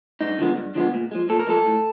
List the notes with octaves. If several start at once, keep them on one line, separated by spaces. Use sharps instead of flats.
G2 D#4
D3 F3 G#3 B3
G2
D3 F3 G#3 B3
A#2
F3 G#3
A#2 A4
A#4
F3 G#3 A4
A2